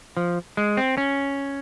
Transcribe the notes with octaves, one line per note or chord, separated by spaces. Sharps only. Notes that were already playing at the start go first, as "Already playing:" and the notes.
F3
G#3
C4
C#4